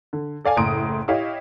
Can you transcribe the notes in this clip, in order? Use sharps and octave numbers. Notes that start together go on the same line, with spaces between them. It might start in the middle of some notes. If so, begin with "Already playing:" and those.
D3
A4 D5 F5 G#5
F#1 A2 A#5 C6 D#6 D7
E4 G4 C#5 D#5 F5